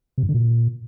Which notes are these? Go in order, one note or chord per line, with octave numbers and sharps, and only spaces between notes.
C3
G2
D3
A#2